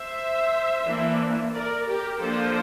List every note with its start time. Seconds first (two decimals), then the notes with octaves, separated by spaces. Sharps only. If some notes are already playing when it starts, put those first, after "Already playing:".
Already playing: C5 E5
0.86 E3 A#3 D4
1.53 A#4 D5
1.87 G4 A#4
2.20 F3 A#3 D4 A4 C5